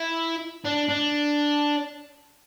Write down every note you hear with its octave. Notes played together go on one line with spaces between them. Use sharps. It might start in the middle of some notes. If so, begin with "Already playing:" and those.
Already playing: E4
D4
D4